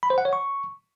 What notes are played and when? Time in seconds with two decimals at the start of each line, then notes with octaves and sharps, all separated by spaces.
0.03 B5
0.10 C5
0.18 F#5
0.25 C#5
0.33 C#6